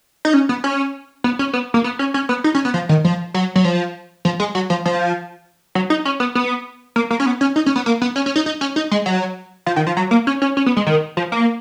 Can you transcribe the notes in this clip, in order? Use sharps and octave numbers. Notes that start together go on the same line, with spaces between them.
D#4
C#4
B3
C#4
B3
C#4
B3
A#3
B3
C#4
C#4
B3
D#4
C#4
B3
F3
D#3
F3
F#3
F#3
F3
F3
G#3
F#3
F3
F3
F#3
D#4
C#4
B3
B3
A#3
A#3
C#4
B3
C#4
D#4
C#4
B3
A#3
B3
C#4
C#4
D#4
D#4
C#4
D#4
G#3
F#3
F3
D#3
F3
F#3
A#3
C#4
C#4
C#4
B3
G#3
D#3
F3
A#3